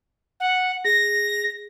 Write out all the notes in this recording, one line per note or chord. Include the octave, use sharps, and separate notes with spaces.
F#5
G#4 A#6